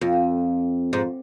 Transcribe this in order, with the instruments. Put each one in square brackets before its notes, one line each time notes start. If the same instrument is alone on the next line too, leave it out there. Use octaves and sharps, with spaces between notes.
[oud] F2
G#2